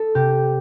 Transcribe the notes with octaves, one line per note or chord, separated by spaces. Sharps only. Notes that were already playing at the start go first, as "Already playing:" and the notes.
Already playing: A4
C3 G4